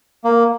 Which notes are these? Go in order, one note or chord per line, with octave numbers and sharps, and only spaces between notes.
A#3